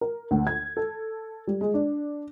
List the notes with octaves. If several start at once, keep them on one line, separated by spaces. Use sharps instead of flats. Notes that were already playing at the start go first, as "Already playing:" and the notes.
A#4
D2
G#6
A4
G3
G#3
D4